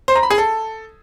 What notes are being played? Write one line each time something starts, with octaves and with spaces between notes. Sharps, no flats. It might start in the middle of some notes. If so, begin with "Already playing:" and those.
C5
A#5
B5
G#4
A4